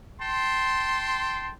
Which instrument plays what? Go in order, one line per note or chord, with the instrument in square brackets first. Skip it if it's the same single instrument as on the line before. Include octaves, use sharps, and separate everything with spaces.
[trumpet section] G5 A5 C6